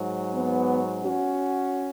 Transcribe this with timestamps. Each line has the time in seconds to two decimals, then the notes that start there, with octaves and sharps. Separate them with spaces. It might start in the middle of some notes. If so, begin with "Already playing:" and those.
Already playing: G#2 F#3
0.33 B3
1.02 C#4 F#4